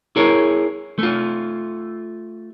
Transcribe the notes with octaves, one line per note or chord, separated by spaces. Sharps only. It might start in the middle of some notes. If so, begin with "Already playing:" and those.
E4 G#4 A#4 C#5
A3 F4